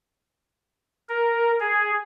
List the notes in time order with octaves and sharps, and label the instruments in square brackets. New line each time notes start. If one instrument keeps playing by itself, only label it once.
[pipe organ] A#4
G#4